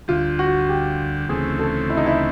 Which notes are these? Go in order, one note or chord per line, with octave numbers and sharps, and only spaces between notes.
D2 D3 G3 F4
F#4
G4
D2 C#3 E3 A3 C4 G#4
A4
E4
D#4
E4